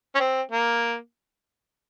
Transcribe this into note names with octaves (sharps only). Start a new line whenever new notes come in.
C#4
C4
A#3